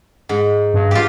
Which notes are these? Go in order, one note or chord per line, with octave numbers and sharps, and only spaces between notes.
G#2
G2
F4 G4